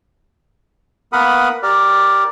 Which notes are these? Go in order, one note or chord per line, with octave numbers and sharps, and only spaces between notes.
A#3 B3 A#4 F#5 B5 D#6
G4 A#4 D5